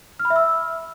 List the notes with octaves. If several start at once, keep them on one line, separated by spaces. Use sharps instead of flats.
F6
B5
E5
E6